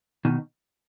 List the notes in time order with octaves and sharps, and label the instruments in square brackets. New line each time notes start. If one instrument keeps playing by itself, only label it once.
[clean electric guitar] B2 D#3